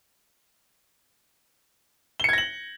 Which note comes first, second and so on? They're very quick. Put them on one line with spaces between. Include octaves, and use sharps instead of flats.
G7 C#7 G#6 A#6 F#7